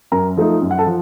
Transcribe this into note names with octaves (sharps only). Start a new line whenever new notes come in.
F#2 A#4 A#5
F3 A3 D#4
F#2
F#5
A4 A5
F3